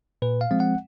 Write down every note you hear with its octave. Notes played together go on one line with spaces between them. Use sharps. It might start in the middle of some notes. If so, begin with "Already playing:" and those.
A#2 B4
F5
F3 G#3 C4
F#5